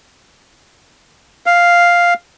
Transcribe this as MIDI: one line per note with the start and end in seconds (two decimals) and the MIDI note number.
1.46 2.14 77